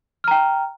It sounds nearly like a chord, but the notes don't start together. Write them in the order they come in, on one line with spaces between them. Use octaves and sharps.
F6 A#5 G5